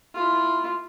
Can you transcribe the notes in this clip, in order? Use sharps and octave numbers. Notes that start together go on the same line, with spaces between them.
E4 F4